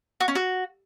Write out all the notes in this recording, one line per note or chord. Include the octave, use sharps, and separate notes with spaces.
F#4
C#4
F#4